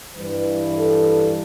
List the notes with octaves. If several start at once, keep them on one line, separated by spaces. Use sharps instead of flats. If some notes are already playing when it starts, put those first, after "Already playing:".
G2 E3 G3 B4
A4